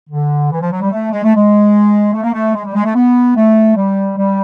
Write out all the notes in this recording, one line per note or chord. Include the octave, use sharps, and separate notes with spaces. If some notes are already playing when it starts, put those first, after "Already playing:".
D3
E3
F3
F#3
G3
A3
G#3
A3
G#3
A3
A#3
A3
G#3
G3
G#3
A3
B3
A3
G3
G3